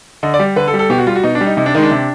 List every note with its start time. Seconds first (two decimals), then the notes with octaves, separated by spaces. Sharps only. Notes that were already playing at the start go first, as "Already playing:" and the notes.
0.23 D3 D#5
0.34 D5
0.39 G3
0.56 D3 B4
0.68 A4
0.74 G3
0.79 A4
0.90 B2 G4
0.98 F#4
1.07 G3 F4
1.15 F#4
1.23 B2 D#4
1.35 D4
1.41 G3
1.46 D#4
1.57 C3 D#4
1.66 D4
1.75 D#3 G#3 D#4
1.83 D4
1.91 C3